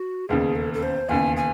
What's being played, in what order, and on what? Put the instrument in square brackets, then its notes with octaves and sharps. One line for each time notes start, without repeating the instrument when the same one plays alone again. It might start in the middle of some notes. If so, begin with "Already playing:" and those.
Already playing: [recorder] F#4
[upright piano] E1 D#2 C#3 [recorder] G#4
[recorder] A4
A4
C5
[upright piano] E1 D#2 C#3 [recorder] G#5
[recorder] G#5